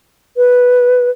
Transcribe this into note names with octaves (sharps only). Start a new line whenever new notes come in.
B4